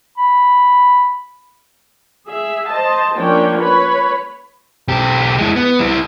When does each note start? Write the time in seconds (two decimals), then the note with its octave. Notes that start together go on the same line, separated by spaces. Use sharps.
0.17 B5
2.29 G#4 E5
2.69 C5 D#5 A5
3.17 F3 A#3 C#4 D4 C#5 G5
3.58 B4 C#5 B5
4.88 B1 G4
5.38 G#3 E4
5.56 B3
5.79 G3 E4